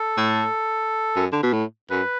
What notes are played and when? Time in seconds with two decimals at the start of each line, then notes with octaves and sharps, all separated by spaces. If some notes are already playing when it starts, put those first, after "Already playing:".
Already playing: A4
0.17 A2
1.16 F#2
1.32 D3
1.43 B2
1.53 A2
1.90 F#2 B4